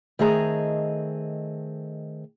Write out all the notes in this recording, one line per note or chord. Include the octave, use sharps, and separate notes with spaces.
D#3 A3 C4 G#4 D#5 A#5